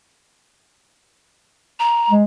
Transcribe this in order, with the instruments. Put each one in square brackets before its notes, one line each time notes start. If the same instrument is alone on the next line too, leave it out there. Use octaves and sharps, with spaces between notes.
[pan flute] A#5
[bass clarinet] G#3